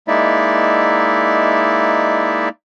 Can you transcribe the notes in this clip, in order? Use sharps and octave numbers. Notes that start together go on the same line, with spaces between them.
G#3 A#3 D#4 E4 D5 E5